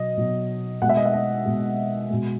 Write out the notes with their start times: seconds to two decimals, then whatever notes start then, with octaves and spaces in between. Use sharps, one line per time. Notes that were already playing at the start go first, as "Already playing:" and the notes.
Already playing: B2 F#3 D#5
0.17 B2 F#3
0.82 B2 G#3 F#5
0.89 E5
0.97 D#5
1.05 E5
1.14 D#5
1.46 B2 G#3
2.10 B2 G#3